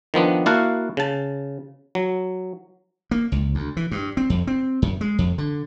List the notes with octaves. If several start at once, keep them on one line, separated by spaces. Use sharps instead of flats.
D#3 F3 B3 D4
A#3 E4 F#4 F5 F#5 A5
C#3 A5
F#3
A#3
C#2
D2
E3
G2
C4
F2
C4
F#2
G#3
F2
D3